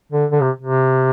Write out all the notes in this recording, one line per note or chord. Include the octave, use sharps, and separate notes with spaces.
D3
D3
C3
C3